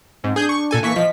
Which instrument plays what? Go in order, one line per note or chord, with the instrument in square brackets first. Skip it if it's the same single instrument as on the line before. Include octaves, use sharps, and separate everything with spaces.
[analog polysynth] G#2 [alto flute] C4
[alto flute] D4 [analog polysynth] G#4 G6
[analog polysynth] C#6
A#2 A4 G#5
[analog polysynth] E3 C#6 B6 [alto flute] A#3
[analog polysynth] F3 B6 [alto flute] D#5